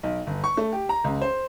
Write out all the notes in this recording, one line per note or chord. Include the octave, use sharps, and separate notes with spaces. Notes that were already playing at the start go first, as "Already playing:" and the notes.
B1
G1
C#6
A3
G4
A#5
C#2
C5